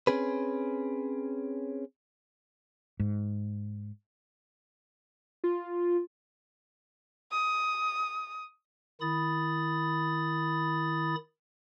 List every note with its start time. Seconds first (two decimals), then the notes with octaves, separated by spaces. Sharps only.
0.07 C4 C#4 G#4 B4
3.00 G#2
5.44 F4
7.31 D#6
9.01 D#3 E4 B5 D#6 A6